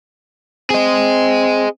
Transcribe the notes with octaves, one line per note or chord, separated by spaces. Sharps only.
C4 G#4 D#5